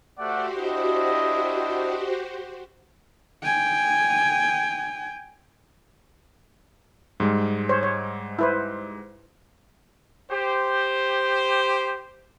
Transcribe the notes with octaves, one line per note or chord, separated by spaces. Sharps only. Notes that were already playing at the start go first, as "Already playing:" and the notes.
A3 F#4 G4 C5 D5 F#5
D4 E4 D#5
G5 G#5
G#2 G3 G#3
C5 C#5
C#5
E4 B4 C5
G4 C5